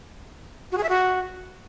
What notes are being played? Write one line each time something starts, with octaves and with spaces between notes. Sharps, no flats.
F#4
G#4
E5
F#4